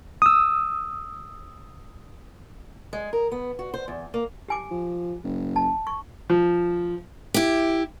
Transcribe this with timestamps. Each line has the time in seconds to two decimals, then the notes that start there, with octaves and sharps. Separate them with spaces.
0.22 D#6 E6
2.93 G#3
3.13 A#4
3.32 B3
3.59 F#4
3.74 C5
3.88 E2
4.14 A#3
4.48 G4 G#5 D6
4.71 F3
5.24 F#1
5.56 A5
5.87 C#6
6.30 F3
7.34 E4 G4